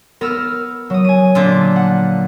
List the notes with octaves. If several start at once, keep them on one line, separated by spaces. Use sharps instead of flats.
B3 A#4 E6 F6
F#3 D#6
G#5 D#7
A#2 D3 F3
F#5